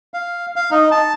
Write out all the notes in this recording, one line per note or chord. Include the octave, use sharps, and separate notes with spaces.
F5
F5
D#4
A5